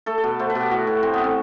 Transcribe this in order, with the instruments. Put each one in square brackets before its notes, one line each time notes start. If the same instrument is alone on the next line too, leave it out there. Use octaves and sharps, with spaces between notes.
[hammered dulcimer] A3 A4
A4
B2 B4
A3 C5
B4
B2
G4
A2 F#4
A2
A2 C4
B3
A3 C4